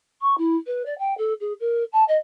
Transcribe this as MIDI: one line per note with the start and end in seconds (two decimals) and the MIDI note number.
0.21 0.35 85
0.38 0.56 64
0.67 0.83 71
0.86 0.97 74
0.99 1.17 79
1.18 1.34 69
1.41 1.53 68
1.60 1.84 70
1.93 2.04 81
2.08 2.17 75